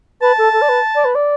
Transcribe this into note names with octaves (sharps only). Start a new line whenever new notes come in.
B4 A5
A4
A4
D5
B4
D5
B4
D5